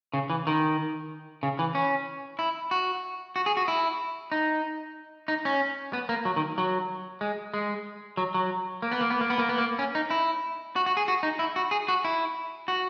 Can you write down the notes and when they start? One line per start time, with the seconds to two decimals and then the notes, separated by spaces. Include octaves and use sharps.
0.13 C#3
0.30 E3
0.47 D#3
1.43 C#3
1.59 E3
1.75 C#4
2.39 E4
2.71 F#4
3.36 F#4
3.46 G#4
3.57 F#4
3.68 E4
4.32 D#4
5.28 D#4
5.45 C#4
5.93 B3
6.09 A#3
6.25 F#3
6.36 D#3
6.58 F#3
7.21 G#3
7.54 G#3
8.17 F#3
8.34 F#3
8.82 A#3
8.92 B3
9.01 A#3
9.10 B3
9.21 A#3
9.30 B3
9.39 A#3
9.49 B3
9.58 A#3
9.79 C#4
9.95 D#4
10.10 E4
10.76 F#4
10.86 F#4
10.97 G#4
11.08 F#4
11.23 D#4
11.39 E4
11.56 F#4
11.71 G#4
11.88 F#4
12.05 E4
12.68 F#4